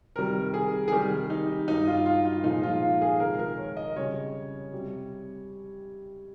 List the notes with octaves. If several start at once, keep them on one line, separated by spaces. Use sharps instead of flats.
F2 C3 D#3 G3 A#4
G#4
G#4
C3 D#3 G3 G4
D#4
G2 G3 D#4
F4
F4
F4
A#2 F3 G#3 D#4
F4
F4
G#4
F2 C3 D#3 G#3 A#4
A#4
C#5
D#5
F2 C#3 G3 C#5
C3 G3